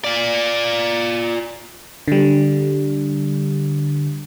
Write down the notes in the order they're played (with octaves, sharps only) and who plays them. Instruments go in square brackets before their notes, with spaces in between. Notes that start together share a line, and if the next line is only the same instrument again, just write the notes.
[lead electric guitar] F4 D5
[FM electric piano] D3 G3